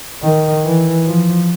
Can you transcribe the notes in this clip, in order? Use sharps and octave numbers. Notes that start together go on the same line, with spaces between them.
D#3
E3
F3